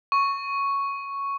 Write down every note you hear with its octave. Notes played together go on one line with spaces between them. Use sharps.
C#6